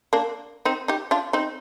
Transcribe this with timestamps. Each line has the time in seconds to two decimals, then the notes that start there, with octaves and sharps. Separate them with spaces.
0.13 A#3 D4
0.65 C4 D#4
0.88 D#4 G4
1.11 D4 F4
1.33 C4 D#4